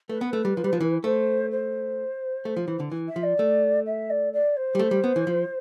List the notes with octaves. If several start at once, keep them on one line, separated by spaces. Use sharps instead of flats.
A3 B4
B3
A3
G3
F3
G3
F3
E3
A3 C5
C5
A3
F3
E3
D3
E3
E5
F3
D5
A3
E5
D5
D5
C5
G3
A3
G3
B3
E3
F3